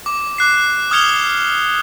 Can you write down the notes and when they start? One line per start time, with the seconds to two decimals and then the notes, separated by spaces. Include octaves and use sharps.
0.06 D6
0.38 D6 F#6 C7
0.91 D#6 F6 G#6 C#7 F7 G7